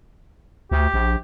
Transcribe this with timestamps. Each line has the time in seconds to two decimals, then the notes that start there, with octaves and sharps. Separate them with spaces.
0.72 D2 G4
0.94 A#1